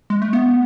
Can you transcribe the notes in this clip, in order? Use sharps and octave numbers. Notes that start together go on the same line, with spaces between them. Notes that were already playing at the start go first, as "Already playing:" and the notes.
G#3
A3
B3